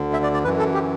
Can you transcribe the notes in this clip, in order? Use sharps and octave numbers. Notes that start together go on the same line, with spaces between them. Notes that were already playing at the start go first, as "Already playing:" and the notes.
Already playing: D2 D3
E5
D5
D5
F#2 E3 B4
A4
G4